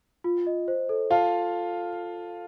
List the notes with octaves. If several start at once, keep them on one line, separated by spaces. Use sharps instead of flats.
F4
D#5
C5
A4
F4 F5 A5